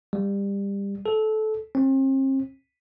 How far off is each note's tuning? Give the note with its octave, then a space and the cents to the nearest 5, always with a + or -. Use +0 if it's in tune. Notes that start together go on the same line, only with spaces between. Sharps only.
G3 +25
A4 -20
C4 +40